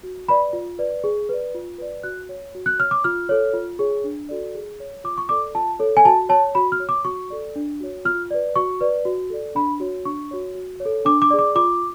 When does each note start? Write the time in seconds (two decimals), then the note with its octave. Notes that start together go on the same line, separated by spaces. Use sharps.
0.03 F#4
0.28 B4 D5 B5
0.53 F4
0.79 B4 D5
1.04 G#4
1.29 B4 D5
1.54 F4
1.78 B4 D5
2.03 F#4 F#6
2.29 C#5
2.55 F#4
2.66 F#6
2.79 C#5 F6
2.91 D6
3.04 F4 F6
3.29 A4 C#5
3.54 F4
3.79 G#4 C#5
4.04 D4
4.29 F#4 A4 D5
4.55 G#4
4.80 C#5
5.04 F4 D6
5.18 C#6
5.29 A4 D5 D6
5.55 F4 A5
5.79 A4 C#5
5.97 G#5
6.05 F#4 A5
6.29 C#5 A5
6.55 F#4 B5
6.72 F6
6.80 C#5
6.89 D6
7.05 F#4 C#6
7.30 A4 D5
7.56 D4
7.80 F#4 C#5
8.05 F4 F6
8.31 B4 D5
8.56 F#4 C#6
8.81 B4 D5
9.05 F#4
9.30 A4 D5
9.55 D4 B5
9.80 F#4 C#5
10.05 D4 C#6
10.31 F#4 C#5
10.55 F#4
10.80 C#5
10.85 A4
11.05 D4 D6
11.22 D6
11.30 G#4 D5
11.39 D6
11.55 F4 D6